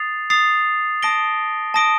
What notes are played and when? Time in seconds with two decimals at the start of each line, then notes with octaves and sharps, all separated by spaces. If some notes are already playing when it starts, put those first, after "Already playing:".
Already playing: D#6 A6 C7 F7
0.30 D#6 A6 C7 F7
1.03 A5 D#6 A#6 D7 G7
1.74 A5 D#6 A#6 D7 G7